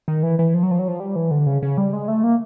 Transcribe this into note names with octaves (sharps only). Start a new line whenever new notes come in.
D#3
E3
E3
F3
F#3
F3
F#3
F3
G3
E3
D3
C#3
C#3
G3
G#3
A3
A#3